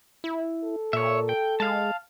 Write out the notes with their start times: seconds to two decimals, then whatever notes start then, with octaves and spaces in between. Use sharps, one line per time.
0.24 E4
0.64 A4
0.93 A#2 C#5 E5
1.29 G5
1.60 G#3 F5 A5